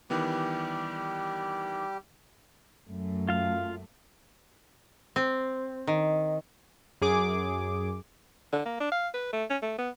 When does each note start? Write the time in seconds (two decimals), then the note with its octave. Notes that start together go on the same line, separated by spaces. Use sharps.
0.10 D#3 E3 G3 B3 G4 D6
2.89 F#2 A3
3.29 F4 F5
5.16 C4
5.87 D#3
7.01 F#2 G#4 D6
8.52 D3
8.65 A#3
8.80 D4
8.92 F5
9.14 B4
9.32 A3
9.50 C#4
9.62 A3
9.78 B3